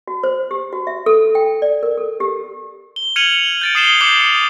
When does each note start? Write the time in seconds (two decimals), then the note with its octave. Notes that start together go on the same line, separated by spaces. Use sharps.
0.08 F#4
0.23 C5
0.51 G4
0.72 F#4
0.87 E5
1.06 A4
1.35 G5
1.62 D5
1.83 A#4
1.97 A4
2.20 G4
2.96 G7
3.16 F6 G#6 C#7 D#7 F7 F#7
3.61 G6 A6 D7
3.75 D#6 C7 E7 G7
4.00 D6 G6 C7 C#7 F#7
4.21 D#6